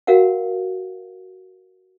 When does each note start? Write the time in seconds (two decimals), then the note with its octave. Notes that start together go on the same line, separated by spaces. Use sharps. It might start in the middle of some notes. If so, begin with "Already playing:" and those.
0.07 F#4 A#4 F5 F#5